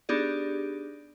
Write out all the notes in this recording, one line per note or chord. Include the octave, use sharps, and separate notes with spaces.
B3 D4 D#4 G4 G#4 D5